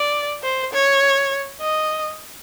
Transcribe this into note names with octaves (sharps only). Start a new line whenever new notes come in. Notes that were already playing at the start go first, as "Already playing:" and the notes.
Already playing: D5
C5
C#5
D#5